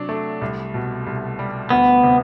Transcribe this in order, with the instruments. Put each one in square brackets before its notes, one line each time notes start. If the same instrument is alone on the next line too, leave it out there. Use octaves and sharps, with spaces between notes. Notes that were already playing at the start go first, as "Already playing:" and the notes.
Already playing: [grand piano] C3 F#3 D4
A3
C2
B2
C2
G3
[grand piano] D2 [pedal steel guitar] B3
[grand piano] C3